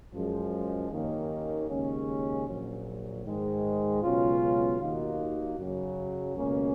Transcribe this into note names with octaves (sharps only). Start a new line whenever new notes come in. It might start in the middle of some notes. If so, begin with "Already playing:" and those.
F#2 F3 G#3
D#2 D#3 A#3 C#4
D#2 C#3 G#3 C#4
A#1 A#2 F#3
G#2 D#3 G#3
C#2 B2 F#3 C#4 F4
D#2 D#3 A#3 D#4 F#4
F#2 C#3 F#3
C#2 B2 A#3 C#4